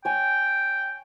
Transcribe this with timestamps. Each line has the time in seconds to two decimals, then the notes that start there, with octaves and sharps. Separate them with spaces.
0.05 C#5 G5 G#5